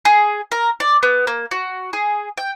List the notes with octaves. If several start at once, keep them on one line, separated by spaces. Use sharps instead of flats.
G#4
A#4
D5
B3
A#3
F#4
G#4
G5